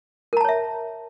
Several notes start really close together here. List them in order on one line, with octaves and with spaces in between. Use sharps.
A#4 A#5 A5 C#5 E5